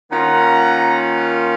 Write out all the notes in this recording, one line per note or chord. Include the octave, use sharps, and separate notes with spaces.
D#3 A#3 C#4 F4 F#5 A#5